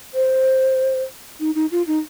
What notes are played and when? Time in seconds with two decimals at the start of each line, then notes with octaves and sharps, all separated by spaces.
0.14 C5
1.40 D#4
1.55 D#4
1.71 F4
1.87 D#4